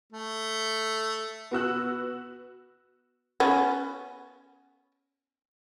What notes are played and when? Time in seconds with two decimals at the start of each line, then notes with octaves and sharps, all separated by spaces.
0.12 A3
1.51 B3 F#4 E6 F#6
3.40 B3 C#4